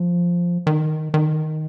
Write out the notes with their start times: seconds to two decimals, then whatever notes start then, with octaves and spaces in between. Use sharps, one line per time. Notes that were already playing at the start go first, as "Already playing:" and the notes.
Already playing: F3
0.67 D#3
1.14 D#3